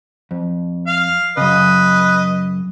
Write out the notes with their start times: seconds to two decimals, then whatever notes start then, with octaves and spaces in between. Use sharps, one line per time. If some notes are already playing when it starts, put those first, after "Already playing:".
0.31 F2
0.87 F5
1.37 F#2 C#3 B4 D#5